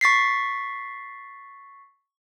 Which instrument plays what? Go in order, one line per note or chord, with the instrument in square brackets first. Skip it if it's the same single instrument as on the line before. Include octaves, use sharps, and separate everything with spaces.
[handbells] C#6 A6 B6 C7